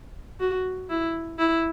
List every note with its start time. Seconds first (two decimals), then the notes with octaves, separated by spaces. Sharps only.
0.40 F#4
0.90 E4
1.39 E4